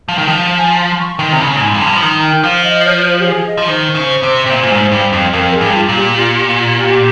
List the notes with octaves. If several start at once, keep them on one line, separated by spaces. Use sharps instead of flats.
F3
D#3
F3
F5
G#5
C6
C#6
D#3 C6
C3
C#3
A#2
G#2 C6
F2
A#5
G2 C6
F3
D#3 A#5
G5
F3 F5
D#5
C#5
C5
G4
G#4
D#5
F3
D#3 C5
C#3
C3
C3
A#2
A#2
G#2
G2
F2
F2 A#4
G#4
G2
F4
A#2
G4
F4
G4
F4
G4